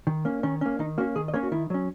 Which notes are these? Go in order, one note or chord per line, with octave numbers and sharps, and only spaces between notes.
D#3
A#3 C#4
D#3 C#4
A#3 C#4
D#3 D#4
A#3 C#4 F#4
D#3 G#4
D#5
A#3 C#4 C#5
F#4
D#3 E4
F#3 C#4